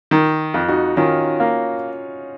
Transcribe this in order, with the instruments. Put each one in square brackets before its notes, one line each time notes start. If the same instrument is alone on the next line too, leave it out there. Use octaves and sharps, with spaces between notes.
[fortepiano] D#3
F2
[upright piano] D#4 F#4
[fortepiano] D#3 [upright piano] C#4 F4
[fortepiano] A#3